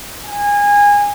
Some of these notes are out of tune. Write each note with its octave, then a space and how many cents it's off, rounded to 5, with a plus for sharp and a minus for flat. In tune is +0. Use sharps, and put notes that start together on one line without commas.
G#5 -25